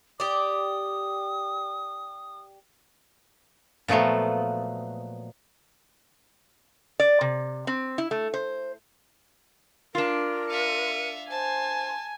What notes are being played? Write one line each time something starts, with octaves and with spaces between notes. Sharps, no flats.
G4 D5 D#6
A#2 F3 F#3 A3 B3
D5
C3
C4
E4
A3
C5
D4 F4 A#4
E5 F5 C#7 D#7
C5 G#5 A5